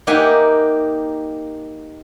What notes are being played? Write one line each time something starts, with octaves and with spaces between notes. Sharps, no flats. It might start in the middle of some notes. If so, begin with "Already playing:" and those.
A#3 D#4 G4 E5 F#5 G#5